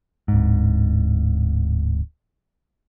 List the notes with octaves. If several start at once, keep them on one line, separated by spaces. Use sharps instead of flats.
D1 G#2